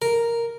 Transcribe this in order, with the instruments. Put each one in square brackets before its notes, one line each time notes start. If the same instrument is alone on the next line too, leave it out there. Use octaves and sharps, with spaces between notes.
[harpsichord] A#4